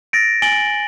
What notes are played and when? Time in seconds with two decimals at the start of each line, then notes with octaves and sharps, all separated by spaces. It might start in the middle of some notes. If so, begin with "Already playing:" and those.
0.13 A6 A#6 D7
0.42 G#5 A6 D7 F#7 G7